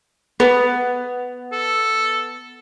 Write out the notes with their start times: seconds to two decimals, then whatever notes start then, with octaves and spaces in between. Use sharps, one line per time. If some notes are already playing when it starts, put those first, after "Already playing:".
0.40 B3 B4
1.52 A4